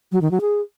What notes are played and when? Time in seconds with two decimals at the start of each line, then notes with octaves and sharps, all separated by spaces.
0.12 F#3
0.22 D#3
0.31 F#3
0.41 G#4